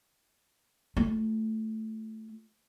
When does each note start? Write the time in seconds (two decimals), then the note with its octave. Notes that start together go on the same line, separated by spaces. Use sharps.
0.97 A3 F4